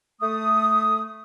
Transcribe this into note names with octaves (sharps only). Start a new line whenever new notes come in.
A3 D#6